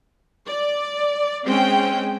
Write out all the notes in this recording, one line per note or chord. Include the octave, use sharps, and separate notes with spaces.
D5
G#3 C4 C#4 G5